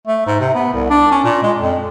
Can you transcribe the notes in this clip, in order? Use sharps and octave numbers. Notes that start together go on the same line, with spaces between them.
A3
G#2
C3
B3
C2
D4
C#4
A#2
G#3
F2